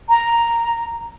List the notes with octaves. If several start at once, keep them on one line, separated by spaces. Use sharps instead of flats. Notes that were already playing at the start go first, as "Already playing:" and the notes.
A#5